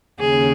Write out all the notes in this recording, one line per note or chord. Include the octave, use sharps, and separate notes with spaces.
D#2 C#3 G#4